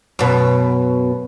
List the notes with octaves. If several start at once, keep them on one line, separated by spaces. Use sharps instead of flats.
F#2 B2